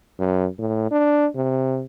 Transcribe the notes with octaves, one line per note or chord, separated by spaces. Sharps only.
F#2
A2
D4
C3